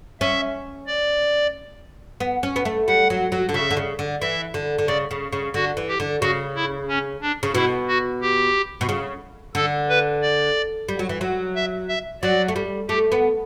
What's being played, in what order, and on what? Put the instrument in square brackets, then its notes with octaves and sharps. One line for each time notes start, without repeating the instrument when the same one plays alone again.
[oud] C#4 [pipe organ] E5
[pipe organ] D5
[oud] B3
C#4
B3
A3
[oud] G3 [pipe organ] F#5
[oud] F#3
F#3
D3
[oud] C#3 [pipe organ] E5
[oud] D3
C#3
D3
[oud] E3 [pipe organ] E5
[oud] D3
D3
[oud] C#3 [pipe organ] D5
[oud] C#3
C#3
[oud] D3 [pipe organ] F#4
[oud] E3
[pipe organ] G4
[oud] D3
[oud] C#3 [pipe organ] F#4
[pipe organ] E4
C#4
D4
[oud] C#3
[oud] B2 [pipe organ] E4
[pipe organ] F#4
G4
[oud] B2
C#3
[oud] D3 [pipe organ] A4
[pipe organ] B4
D5
[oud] G3
F#3
E3
F#3
[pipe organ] E5
E5
[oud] F#3 [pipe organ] D5
[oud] A3
G3
[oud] A3 [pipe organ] G4
[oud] B3